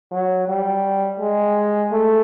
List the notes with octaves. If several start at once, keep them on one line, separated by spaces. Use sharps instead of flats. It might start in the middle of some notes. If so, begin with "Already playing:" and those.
F#3
G3
G#3
A3